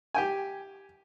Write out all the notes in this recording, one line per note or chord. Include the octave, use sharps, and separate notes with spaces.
G4 G5 G#5